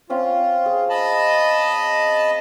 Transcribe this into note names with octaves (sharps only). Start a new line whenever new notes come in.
C4 C#4 F4 F5
G#4
D#5 A5 B5